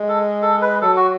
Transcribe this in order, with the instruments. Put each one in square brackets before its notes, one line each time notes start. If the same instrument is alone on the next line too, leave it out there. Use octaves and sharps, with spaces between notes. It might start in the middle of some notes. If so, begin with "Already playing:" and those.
Already playing: [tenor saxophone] G#3
[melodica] A4
A4
B4
[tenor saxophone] F#3 [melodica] A4
[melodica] F#4